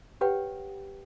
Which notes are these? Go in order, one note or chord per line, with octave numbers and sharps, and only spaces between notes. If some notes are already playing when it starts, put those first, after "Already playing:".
G4 B4 C#5 F#5 G5